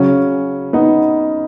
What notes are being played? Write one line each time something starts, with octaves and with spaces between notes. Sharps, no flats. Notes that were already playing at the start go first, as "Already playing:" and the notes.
Already playing: C#3 F#3 C#4
B3 D#4